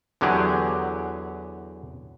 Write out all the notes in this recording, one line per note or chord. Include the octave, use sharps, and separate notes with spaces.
E2 D3 F#3 G4 G#4